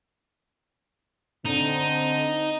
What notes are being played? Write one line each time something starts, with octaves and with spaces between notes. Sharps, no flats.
D3 C4 D#4